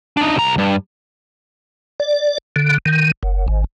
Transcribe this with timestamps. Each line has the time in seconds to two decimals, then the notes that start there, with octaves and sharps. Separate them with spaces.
0.17 D4 D#4
0.36 C2 A#5
0.58 G2
2.00 D5
2.56 D3
2.86 D#3
3.23 F#1
3.48 G#1